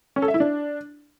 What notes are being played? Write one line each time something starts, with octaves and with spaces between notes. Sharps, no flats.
C#4
A4
E5
E4
D4